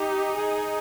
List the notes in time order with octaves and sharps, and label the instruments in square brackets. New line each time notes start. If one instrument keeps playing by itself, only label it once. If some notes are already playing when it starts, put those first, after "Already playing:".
Already playing: [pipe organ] D#4 [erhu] G4
[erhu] G#4